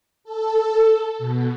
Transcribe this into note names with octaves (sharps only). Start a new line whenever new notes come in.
A4
B2